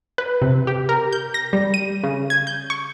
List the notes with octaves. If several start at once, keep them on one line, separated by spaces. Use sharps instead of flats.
B4
C3
G4
A#4
G6
A#6
G3
D#7
C#3
G#6
G6
C#6